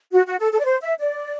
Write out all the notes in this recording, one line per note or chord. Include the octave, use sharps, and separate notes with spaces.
F#4
F#4
A4
A4
D5
C5
E5
D5